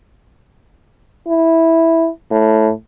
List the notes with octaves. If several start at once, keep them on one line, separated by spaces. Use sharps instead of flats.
E4
A2